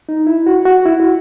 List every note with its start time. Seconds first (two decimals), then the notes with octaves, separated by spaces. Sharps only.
0.09 D#4
0.27 E4
0.47 F#4
0.65 F#4
0.85 E4
1.00 F#4